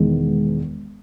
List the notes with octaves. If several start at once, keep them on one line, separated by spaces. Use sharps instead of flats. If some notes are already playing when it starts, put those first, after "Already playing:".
Already playing: E1 E2 D#3 G#3 B3